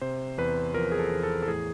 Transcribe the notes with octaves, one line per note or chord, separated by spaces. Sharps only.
C3 C5
E2 B4
F3 A#4
G#4
A4
E2
A4
A4
A2 G#4